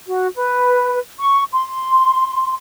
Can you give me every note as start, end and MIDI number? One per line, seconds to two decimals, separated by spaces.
0.08 0.27 66
0.35 0.98 71
1.20 1.43 85
1.53 2.54 84